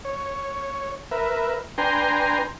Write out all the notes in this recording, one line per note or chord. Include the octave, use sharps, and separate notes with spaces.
C#5
A#4 B4 E5
D4 B4 G5 G#5 A#5 C6